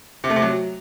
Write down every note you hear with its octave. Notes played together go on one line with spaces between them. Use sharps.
C3
A3
C3
F#3